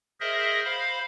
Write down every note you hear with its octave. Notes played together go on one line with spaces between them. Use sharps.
G#4 A#4 C5 D#5 E5
C5 F5 B5